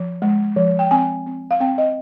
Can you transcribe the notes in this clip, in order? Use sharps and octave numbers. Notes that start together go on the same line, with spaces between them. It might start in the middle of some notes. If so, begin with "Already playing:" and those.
Already playing: F3
G#3
F3
G5
C4 G#5
C4
F5
C4 G5
D#5